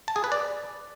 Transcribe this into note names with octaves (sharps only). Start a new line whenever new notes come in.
A5
G#4
B4
D5